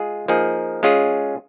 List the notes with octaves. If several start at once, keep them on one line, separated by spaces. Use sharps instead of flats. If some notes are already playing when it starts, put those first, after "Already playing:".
Already playing: G#3 F4 G#4
F3 A#3 D#4 G#4
G#3 C#4 F4 G#4